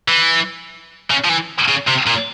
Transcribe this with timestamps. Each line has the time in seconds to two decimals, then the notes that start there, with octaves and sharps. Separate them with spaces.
0.08 E3
1.11 C#3
1.25 F3
1.30 E3
1.68 C#3
1.87 C3
2.06 A#2